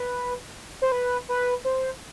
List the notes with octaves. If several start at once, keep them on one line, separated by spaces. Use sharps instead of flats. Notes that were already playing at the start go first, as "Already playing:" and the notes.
Already playing: B4
C5
B4
B4
C5